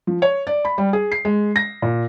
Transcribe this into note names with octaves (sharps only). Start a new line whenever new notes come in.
F3
C#5
D5
B5
G3
G#4
C7
G#3
A#6
A#2